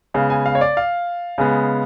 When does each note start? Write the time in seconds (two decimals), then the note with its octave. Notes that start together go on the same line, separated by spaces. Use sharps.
0.14 C#3 G#3 B3 F5
0.30 G#5
0.46 F5
0.55 C#5
0.61 D5
0.77 F5
1.38 C#3 G#3 B3